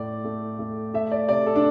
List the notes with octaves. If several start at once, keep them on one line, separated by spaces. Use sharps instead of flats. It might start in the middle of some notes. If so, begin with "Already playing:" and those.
Already playing: A2 A3 D5
A3
A3
A3 E5
D5
C3 D5
A4
D4